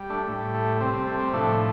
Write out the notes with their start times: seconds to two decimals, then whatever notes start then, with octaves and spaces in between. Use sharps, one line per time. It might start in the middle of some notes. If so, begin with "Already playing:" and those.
Already playing: G3
0.10 A3 D4
0.28 A2 G3
0.55 A3
0.81 C3 G3 C4
0.94 C4
1.07 A3
1.19 C4
1.33 A2 F3 A3 D4